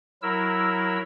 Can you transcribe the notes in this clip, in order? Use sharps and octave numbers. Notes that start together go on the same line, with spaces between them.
F#3 E4 A#4 E6